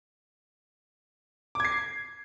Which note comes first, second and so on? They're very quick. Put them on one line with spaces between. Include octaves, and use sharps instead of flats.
D6 G#6 C7